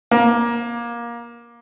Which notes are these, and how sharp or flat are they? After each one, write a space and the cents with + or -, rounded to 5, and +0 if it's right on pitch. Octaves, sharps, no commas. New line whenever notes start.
A#3 +20